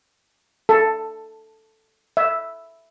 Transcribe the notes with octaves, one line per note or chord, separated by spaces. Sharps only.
A4
E5